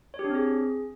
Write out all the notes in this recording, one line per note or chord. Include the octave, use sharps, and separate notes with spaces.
C#5
G4
D4
C4
G#4